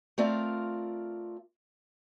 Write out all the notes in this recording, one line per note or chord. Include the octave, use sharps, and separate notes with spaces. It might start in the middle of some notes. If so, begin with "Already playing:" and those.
A3 C4 F4 A#4 D5 F5